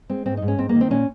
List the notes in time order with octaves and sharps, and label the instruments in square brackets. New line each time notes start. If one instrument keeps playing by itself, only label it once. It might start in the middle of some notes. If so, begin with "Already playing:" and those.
[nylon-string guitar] G#3 C4
G#2 C4
D#4
G#2
C#4
G#2 C4
A#3
D#3
C4
A#2 C#4